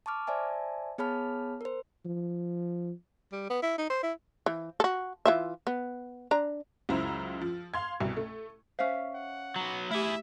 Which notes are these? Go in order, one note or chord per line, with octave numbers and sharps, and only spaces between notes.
A5 C#6 D6 F6
C5 D5 E5 G#5 A5
B3 G#4 C#5 A5 B5 F6
A#4 C5
F3
G3
B3
E4
D#4
C5
E4
E3
F#4 A4
E3 F4 E5
B3
D4 A#5
C#2 F#2 E4 C5 A#5 E6
F3
F5 C6 G#6
C2 B2
A3
C#4 C5 E5 F5
F#5
F#3 B3 A#5
A3 E4 G4 G#4 E5